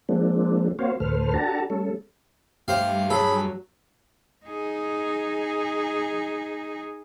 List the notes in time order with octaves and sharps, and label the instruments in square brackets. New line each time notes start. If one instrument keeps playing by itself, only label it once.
[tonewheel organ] F3 G#3 A#3 C4 D4
A#3 C4 F#4 C5 C#5 F5
D2 A2 A4 B4 C5 F6
D4 F#4 G4 A4 A5 A#5
G3 A3 C#4 A4
[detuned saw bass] G2 [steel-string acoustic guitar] A3 G4 [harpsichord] C5 F5
[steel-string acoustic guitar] F#3 [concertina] G#4 B5 [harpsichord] A4
[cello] D#4 G#4